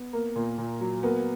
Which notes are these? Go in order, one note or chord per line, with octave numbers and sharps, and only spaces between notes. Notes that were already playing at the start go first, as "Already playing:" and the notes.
Already playing: B3
A#3
A#2
A#2
F#3
A#3 B3